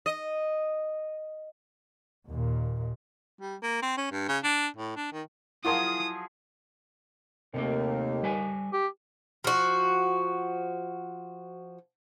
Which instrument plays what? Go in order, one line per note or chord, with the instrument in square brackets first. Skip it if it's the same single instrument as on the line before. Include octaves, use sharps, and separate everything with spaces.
[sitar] D#5
[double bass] D#2 A#2
[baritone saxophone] G3
A#3
C4
C#4
G2
C#3
D4
A2
D4
D#3
[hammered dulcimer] F3 F#3 G#4 [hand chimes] E4 [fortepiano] F4 A#4 C6 [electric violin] D#6
[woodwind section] D#2 [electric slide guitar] C3 A3 A#3
[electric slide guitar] G3 B4 G#5
[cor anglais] G4
[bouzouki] F3 F#4